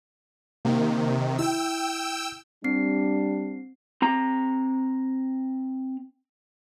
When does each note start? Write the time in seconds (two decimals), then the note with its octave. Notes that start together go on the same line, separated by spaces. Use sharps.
0.65 C3 D#3 A#3
1.38 E4 G5 E6
2.64 G3 C4 D4 C7
4.02 C4 A#5